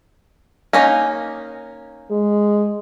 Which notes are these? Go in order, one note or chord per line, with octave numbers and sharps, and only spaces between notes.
A#3 C#4 D#4
G#3